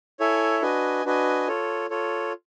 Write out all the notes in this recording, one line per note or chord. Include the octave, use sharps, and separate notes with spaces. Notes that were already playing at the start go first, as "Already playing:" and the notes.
E4 A4 C#5 E5 G#5
D4 F#4 B4 D#5 G#5
D4 F#4 B4 D#5 G#5
F4 A4 C#5
F4 A4 C#5